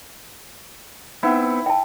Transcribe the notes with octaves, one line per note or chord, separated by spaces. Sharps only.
B3 C4 D#4 E4 F#5 G5
G5 A5